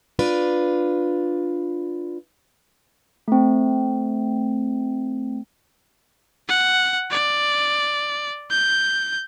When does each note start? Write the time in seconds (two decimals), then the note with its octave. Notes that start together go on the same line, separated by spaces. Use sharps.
0.19 D4 F4 B4
3.28 A3 C4
6.48 F#5
7.11 D5
8.51 G6